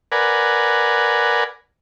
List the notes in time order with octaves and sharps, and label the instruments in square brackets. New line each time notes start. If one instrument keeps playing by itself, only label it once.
[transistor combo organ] A#4 B4 D5 F#5 G#5